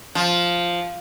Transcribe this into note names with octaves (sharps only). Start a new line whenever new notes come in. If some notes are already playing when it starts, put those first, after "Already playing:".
F3